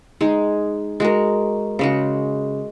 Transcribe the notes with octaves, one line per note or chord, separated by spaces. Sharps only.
G#3 D#4 G#4
G#3 F#4 A#4
C#3 G#3 F#4